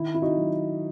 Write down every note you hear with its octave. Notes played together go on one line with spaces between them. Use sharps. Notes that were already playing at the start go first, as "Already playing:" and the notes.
Already playing: D#3 E4
E4
D#4 F#4
F#3